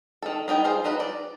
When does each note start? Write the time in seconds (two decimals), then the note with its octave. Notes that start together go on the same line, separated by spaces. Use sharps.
0.22 D#3 A4
0.48 B3 D#4 D5 G5
0.64 F4 G#4 C5
0.84 F#3 D#4 F#4 B4
1.00 D5